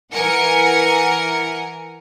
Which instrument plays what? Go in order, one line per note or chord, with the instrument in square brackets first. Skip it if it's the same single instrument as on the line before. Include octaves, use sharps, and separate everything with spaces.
[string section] E3 A#4 F#5 G#5 C#7